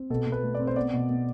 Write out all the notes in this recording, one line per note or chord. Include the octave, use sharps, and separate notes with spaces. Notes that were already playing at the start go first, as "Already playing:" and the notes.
Already playing: C4
B2 A4
B2
B4
A3
D5
C4
C5
B3 D5
B2
B3